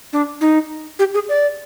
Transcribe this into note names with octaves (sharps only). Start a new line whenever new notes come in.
D4
D#4
G4
G#4
D5